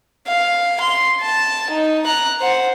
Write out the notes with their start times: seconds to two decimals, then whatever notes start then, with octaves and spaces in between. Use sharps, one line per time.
0.27 F5
0.81 C6
1.22 A5
1.70 D#4
2.06 A#5 F#6
2.41 C5 F#5